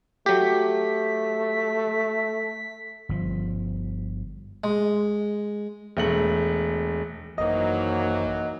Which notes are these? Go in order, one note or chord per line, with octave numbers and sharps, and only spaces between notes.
F#3 A3 G4 B6
G1 F3
G#3
E1 A3 F#7
G#1 F#2 E3 F#3 A#3 D#4 C5 D#5